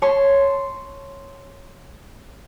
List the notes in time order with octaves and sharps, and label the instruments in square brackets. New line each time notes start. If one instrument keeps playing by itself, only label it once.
[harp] C#5 A5 C6